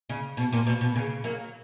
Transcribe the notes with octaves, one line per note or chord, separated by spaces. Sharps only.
C#3
B2
A#2
B2
B2
C#3
F#3 A#3